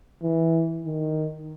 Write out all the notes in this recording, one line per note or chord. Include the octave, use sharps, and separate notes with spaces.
E3
D#3